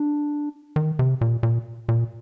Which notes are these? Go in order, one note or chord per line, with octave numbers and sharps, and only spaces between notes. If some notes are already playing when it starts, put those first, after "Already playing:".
Already playing: D4
D#3
C3
A#2
A#2
A#2